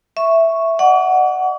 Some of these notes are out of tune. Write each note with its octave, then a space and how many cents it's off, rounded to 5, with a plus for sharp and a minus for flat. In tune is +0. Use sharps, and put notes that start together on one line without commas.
E5 +0 C#6 +0
D5 +45 F#5 +0 C#6 +45